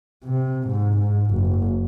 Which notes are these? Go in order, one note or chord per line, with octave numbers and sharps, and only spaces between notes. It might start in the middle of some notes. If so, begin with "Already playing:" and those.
C3
G#2
G#2
F#1